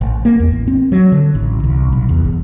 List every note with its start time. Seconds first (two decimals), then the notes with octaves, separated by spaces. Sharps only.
0.01 A1
0.25 A#3
0.40 E2
0.52 A1
0.68 C4
0.92 F#3
1.12 D3
1.35 A1
1.64 C2
1.93 B1
2.09 E2
2.25 G1